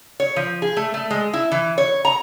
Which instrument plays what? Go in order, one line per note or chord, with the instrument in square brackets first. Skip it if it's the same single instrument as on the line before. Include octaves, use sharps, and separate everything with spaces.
[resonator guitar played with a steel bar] C#5
F3
G#4
A3
A3
G#3
E4
E3
C#5
A#5